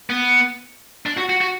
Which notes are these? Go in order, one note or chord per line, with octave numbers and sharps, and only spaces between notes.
B3
D4
F#4
F#4
F#4